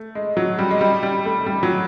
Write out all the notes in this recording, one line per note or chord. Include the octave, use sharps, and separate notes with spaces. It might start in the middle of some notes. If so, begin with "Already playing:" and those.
Already playing: A3
G#3
F#3
G3
G#3
G3
G3
A3
G3
F#3